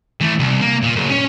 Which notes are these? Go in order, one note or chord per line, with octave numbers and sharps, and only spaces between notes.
E3 A3
C2
A#3
A#2
F#2 C#3
C#4 C#5